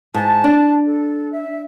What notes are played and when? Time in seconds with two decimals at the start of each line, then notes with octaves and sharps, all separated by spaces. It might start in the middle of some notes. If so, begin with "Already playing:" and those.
0.14 G#2 A5
0.44 D4
0.86 A4
1.32 E5